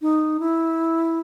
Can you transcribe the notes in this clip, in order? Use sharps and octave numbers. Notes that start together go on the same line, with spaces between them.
D#4
E4